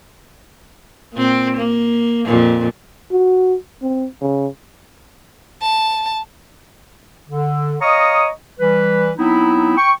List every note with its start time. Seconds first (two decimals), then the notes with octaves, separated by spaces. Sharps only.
1.13 A#2 C4
1.57 A#3
2.26 F2 A#2
3.12 F#4
3.82 C4
4.21 C#3
5.62 A5
7.28 D3
7.81 C#5 D#5 F5 A#5 C#6 D#6
8.59 E3 G3 B4
9.17 F#3 B3 C4 D#4 E4
9.77 G5 C#6